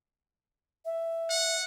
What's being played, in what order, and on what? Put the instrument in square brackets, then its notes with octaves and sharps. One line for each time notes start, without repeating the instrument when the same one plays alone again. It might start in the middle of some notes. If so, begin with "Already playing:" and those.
[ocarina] E5
[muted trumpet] F#5